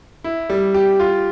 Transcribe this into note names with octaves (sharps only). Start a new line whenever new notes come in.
E4
G3
G4
F4